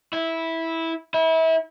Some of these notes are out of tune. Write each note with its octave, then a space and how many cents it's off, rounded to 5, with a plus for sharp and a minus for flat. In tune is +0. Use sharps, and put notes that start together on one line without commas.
E4 -10
E4 -30